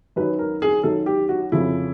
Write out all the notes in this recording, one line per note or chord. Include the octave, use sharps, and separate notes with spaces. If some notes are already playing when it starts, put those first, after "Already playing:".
F#2 D#3 F#3 B4
A#4
G#4
F#2 D#3 F#3 A4
G4
F#4
F2 C#3 F3 E4